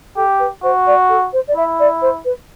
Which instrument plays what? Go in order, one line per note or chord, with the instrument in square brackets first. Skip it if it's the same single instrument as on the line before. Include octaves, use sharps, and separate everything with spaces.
[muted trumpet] G4 [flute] A4
[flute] B4
[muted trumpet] F#4 [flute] C5
[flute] D5
A4
C5
D5
[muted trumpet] E4 [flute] E5
[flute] D5
C5
B4